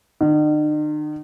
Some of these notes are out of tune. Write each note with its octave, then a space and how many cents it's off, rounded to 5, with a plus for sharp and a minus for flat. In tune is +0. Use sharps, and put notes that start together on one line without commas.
D#3 -45